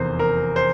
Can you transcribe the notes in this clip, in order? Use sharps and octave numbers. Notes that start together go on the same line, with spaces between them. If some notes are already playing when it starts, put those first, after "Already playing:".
Already playing: F1 E2 A#4 C5
A#4
C5